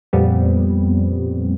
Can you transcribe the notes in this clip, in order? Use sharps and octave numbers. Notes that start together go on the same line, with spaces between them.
F2 A#2 G3 B3 C4